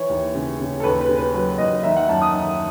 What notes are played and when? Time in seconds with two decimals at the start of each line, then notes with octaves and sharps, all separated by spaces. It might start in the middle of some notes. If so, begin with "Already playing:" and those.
Already playing: E3 C#5
0.09 D#2
0.35 C#3
0.59 C#3
0.80 A4
0.84 D#2 B4
1.01 B4
1.09 C#3
1.18 B4
1.34 F#3 B4
1.58 D#2 D#5
1.83 D#3 E5
1.97 F#5
2.09 F#2 A5
2.22 D#6
2.33 D#3